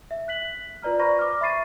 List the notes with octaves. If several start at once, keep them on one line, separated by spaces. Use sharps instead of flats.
E5
F#6 B6 F#7
F4 B4 D5 A#5 F6
C5 D5 A#5 B5 C#6 A#6
D6 F6
E5 B5 C#6 A6 C7 D#7